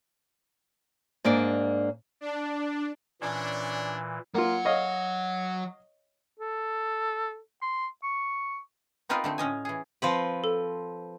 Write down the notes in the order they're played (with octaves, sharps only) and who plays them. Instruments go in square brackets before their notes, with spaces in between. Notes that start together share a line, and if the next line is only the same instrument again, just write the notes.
[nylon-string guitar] G#2 A#3 D4 D5
[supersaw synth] D4
[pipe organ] A#2 E3 [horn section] C#4 D4
[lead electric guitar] F#3 F#5 [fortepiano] A#3 F4
[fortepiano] C#5 D#5 F5
[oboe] A4
C6
C#6
[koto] B3 C4 D#4 F4 A#4 B4
D3 A3 C4
A2 C#4 D#5 G#5
E3 G#4
F3 C4 B4
[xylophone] A4